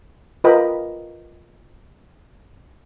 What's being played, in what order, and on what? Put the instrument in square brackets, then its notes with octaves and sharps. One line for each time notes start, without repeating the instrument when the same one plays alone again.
[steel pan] F4 A#4 B4 D#5 G5 B5